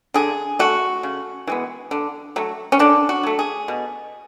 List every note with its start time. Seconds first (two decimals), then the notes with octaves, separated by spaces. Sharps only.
0.14 D3 G#4
0.59 A3 F#4
1.03 C#3
1.47 E3 G#3 B3
1.91 D3
2.36 F#3 A3
2.72 C#4
2.79 D3 D4
3.09 F#4
3.23 F#3 A3
3.39 G#4
3.68 B2